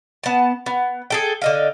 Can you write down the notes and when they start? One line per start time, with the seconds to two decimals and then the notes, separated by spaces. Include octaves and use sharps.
0.23 B3 A5
0.66 B3
1.10 G#4 A4 G5
1.42 D3 D#5 F5